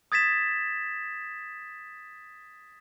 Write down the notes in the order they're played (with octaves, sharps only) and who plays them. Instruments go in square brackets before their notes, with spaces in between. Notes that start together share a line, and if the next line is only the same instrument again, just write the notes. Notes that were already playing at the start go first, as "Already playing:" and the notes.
[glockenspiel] D#6 G#6 A6 B6 E7